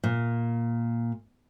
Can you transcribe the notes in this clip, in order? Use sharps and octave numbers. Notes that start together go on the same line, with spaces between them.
A#2